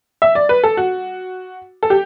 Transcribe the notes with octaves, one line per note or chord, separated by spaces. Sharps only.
E5
D5
B4
A4
F#4
A4
G4